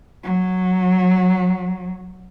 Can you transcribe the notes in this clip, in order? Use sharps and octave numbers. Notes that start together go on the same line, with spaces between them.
F#3